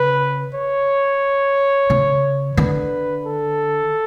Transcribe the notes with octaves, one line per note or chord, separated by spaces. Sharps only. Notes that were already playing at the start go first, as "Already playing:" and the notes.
Already playing: C#3 B4
C#5
C#3
D3 B4
A4